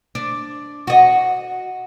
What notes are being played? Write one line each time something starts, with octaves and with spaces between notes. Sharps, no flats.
D4
F#4 D#5